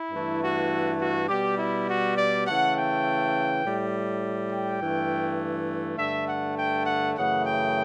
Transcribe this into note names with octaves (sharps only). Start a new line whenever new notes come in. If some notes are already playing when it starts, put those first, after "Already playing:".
Already playing: E4
G2 E3 A3
F#4
F#4
B2 G3 G4
E4
F#4
D5
C#3 E3 A3 F#5
G5
A2 G3
G5
G2 E3 A3
G2 D3 A3 E5
F#5
G5
F#5
F#2 C#3 E3 A3 F#5
G5